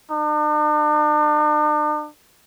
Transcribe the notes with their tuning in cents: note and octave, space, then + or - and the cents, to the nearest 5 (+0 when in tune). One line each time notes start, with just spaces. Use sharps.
D4 +45